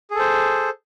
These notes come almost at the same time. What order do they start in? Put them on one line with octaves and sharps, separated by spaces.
G#4 A4 C5